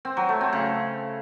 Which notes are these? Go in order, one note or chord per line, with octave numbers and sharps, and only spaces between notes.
C4
F#3
A3
C4
C#3